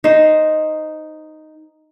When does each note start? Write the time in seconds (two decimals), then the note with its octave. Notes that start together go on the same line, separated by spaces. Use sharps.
0.04 D#4 C5